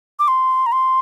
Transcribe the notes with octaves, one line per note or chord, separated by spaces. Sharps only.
D6
C6
A#5
C6